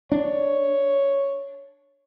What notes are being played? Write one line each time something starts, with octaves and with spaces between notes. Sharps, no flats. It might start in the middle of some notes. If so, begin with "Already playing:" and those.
D4 C#5